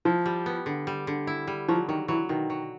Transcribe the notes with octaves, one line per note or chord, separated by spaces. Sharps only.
F3 E4
G3
B3
D3
G3
D3
E4
G3
F3 F#3
D#3 F#3
E3 F#3
B2 D#3
F#3